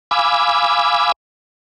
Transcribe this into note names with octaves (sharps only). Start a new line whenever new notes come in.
F5 G#5 B5 D6 E6